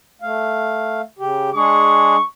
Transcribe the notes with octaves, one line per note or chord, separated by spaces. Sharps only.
A3 F5
C#3 G4
G#3 D4 G#4 C#6